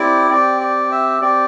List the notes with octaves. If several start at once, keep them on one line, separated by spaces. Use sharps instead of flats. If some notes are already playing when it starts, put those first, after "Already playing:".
Already playing: C4 E4 G4 D5
C4 G4 D5
D5
E5
C4 G4 D5